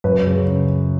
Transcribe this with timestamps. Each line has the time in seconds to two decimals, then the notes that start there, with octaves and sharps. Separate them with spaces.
0.04 F#2 B4
0.26 C#3